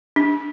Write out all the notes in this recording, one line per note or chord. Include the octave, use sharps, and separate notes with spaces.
D4